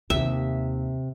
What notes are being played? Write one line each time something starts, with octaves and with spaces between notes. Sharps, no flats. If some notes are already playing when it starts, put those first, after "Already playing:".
D#2 C3 E5